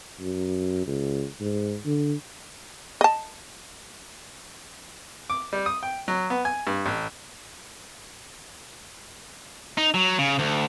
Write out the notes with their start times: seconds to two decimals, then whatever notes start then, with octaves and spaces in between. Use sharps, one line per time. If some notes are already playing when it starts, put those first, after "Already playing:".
0.20 F#2
0.86 C#2
1.40 G#2
1.85 D3
3.01 D#5 A5
5.30 D6
5.53 G3
5.66 D#6
5.83 G5
6.08 F#3
6.30 B3
6.45 G#5
6.67 G2
6.86 A1
9.78 D#4
9.94 F#3
10.19 C#3
10.39 D2